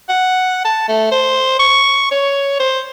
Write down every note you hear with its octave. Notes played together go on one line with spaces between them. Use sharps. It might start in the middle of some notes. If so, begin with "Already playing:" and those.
F#5
A5
A3
C5
C#6
C#5
C5